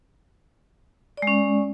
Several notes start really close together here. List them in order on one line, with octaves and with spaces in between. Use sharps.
D5 G#3 C#4